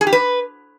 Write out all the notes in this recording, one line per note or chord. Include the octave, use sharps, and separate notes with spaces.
G#4
G4
B4